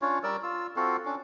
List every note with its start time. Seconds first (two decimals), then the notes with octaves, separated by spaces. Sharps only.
0.02 C#4 D4 F4 C#5
0.23 G3 A#4 D5 E6
0.43 F4 E6
0.76 C4 F4 F#4 A4
1.05 C#4 D4